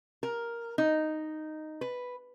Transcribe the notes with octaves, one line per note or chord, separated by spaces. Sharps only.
A#4
D#4
B4